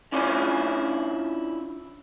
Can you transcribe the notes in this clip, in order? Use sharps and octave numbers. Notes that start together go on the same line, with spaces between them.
C#4 D4 E4 F4 C#5 G#5